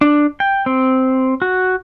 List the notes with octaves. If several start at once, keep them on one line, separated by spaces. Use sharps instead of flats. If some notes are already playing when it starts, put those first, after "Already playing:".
D4
G5
C4
F#4